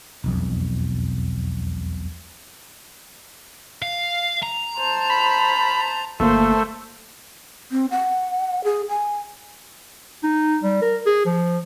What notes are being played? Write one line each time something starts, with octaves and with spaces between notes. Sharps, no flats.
E1 B1 F2
F5
A#5
C5 A5
B5
G1 A3 A#3 C5
C4
F#5
G#4
G#5
D#4
G3
A#4
G#4
F3